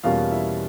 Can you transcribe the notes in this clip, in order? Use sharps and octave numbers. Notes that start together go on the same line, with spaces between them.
E2 B2 G3 A#3 C#4 F4 F5
E4 E5